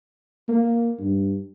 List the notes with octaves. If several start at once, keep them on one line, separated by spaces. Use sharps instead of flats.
A#3
G2